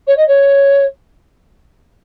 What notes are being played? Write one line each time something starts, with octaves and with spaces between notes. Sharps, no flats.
C#5
D#5
C#5